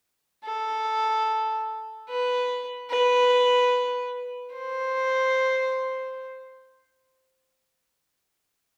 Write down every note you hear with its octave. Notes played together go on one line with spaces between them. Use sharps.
A4
B4
B4
C5